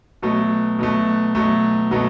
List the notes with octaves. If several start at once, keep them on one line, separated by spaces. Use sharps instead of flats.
B2 F#3 A3
B2 F#3 A3
B2 F#3 A3
B2 F#3 A3